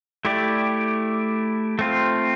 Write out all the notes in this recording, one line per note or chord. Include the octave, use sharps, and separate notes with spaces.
A3 E4 G4 D5
A3 C4 F4